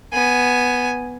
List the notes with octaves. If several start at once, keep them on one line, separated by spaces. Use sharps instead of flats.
B3 G#5